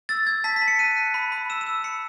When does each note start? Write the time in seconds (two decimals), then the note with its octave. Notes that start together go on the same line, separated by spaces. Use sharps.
0.09 E6 A6
0.27 E6 G#6
0.44 A5 B6
0.56 B6
0.62 A5
0.68 C#7
0.79 F#6 D#7
0.96 F#6
1.14 B5
1.32 B5
1.50 E6 E7
1.61 E7
1.67 E6
1.84 B5 C#7